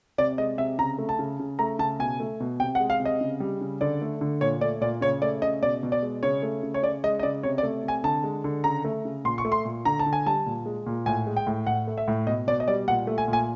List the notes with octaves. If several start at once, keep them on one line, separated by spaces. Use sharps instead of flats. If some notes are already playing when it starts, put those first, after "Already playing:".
C3 D5
G#3 D#5
C3 E5
C#3 A#5
A3
A5
C#3
C#3
A3 A#5
C#3 A5
B2 G#5
A3
B2
C3 G5
F#5
G#3
F5
C3
D#5
C#3
G3
C#3
D3 D5
A3
D3
A#2 C#5
A3 D5
A#2 D5
C#3 C#5
A3 D5
C#3 D#5
B2 D5
B2
D5
G#3
C#3 C#5
A3
C#3
C#5
C#3 D5
G#3 D#5
D#5
C#3 D5
C3 C#5
D5
A3
C3 G#5
D3 A5
G#3
D3
C#3 A#5
A3
C#3
A#2 C6
C#6
A3
C6
A#2
D3 A#5
A5
D3
G#5
G3 A5
A#2
G#3
A#2
A2 G#5
G#3
G5
A2
A2 F#5
A3
E5
A2
B2 D#5
B2 D5
D#5
G3 D5
A#2 F#5
A3
G#5
A#2
G#5